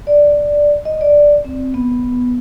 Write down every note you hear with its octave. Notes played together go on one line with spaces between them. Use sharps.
D5
D#5
D5
C4
B3